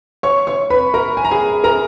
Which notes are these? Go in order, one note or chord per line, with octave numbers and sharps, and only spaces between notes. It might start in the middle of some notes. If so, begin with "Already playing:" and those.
C#5 C#6
C#5 C#6
B4 B5
A#4 A#5
G#5
A#5
G#4 G#5
A#4 A#5